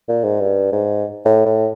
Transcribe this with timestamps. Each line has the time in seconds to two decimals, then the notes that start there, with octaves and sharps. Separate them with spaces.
0.09 A#2
0.24 G#2
0.41 G2
0.72 G#2
1.25 A2
1.46 A2